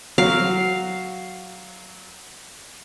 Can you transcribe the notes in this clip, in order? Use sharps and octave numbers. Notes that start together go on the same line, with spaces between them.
F#3 F5